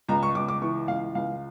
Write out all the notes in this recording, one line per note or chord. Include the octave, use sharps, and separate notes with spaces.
C#2 A#5
C#6
C#2 D6
D6
E3 C#6
C#2 F5
C#2 F5